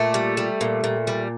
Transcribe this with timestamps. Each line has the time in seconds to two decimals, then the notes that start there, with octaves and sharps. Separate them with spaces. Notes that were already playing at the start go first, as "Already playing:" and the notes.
Already playing: A#2 A3
0.14 G3
0.37 G3
0.61 A#2
0.84 A#2
1.07 G3